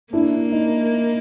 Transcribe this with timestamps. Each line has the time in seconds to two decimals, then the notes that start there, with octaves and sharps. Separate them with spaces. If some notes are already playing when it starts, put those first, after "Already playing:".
0.13 A#3 D4 E4
0.52 D#4